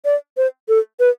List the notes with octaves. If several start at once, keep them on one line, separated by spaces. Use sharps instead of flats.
D5
C5
A4
B4